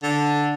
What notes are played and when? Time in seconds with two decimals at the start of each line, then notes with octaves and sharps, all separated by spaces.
0.03 D3